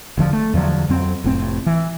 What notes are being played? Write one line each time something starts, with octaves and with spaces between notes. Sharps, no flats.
E1 D3 F3
A3
E2 D3 F3 F#3
F2 F#3 C4
F1 A2 C4
E3